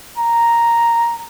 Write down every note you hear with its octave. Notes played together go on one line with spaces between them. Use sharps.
A#5